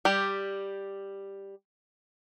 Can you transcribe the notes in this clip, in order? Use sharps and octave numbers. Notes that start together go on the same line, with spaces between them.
G3 G4